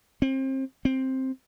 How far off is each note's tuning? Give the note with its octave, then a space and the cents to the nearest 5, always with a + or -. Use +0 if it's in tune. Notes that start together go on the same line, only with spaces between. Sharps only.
C4 +30
C4 +10